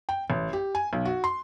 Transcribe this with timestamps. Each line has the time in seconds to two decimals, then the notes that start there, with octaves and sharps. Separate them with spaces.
0.09 G5
0.30 A1
0.53 G4
0.75 G#5
0.93 B1
1.05 F#4
1.24 C6